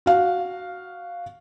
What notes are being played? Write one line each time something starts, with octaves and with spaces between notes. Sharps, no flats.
F#4 F5